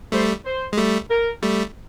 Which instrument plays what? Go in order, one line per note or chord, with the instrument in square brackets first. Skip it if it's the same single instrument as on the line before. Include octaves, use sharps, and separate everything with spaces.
[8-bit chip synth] G3 A3 [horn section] C5
[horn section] C5
[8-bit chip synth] G#3
G3 A3
[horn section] A#4
[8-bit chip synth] G3 A3